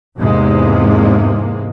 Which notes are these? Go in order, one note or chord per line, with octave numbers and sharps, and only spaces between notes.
E2 G#2 C3 G#3 A#3